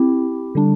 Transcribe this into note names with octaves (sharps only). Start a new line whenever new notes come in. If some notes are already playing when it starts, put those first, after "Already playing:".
Already playing: C4 E4 G4
D3 G3 D4